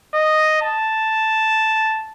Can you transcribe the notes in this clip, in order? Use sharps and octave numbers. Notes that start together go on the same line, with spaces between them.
D#5
A5